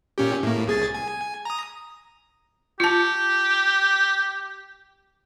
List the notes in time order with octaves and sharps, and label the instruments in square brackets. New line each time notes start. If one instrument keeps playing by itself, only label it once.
[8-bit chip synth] A#2 C#4 G4
A2 A#3
C2 G#4 A6
G#5
A#5 D#6
[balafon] F4 A5 [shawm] G4